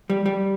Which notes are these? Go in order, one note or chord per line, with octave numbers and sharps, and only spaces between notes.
G3
G3